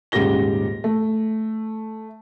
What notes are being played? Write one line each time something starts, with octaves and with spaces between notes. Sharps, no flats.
D#1 G#2 C#3 G4 A#6 G7
A3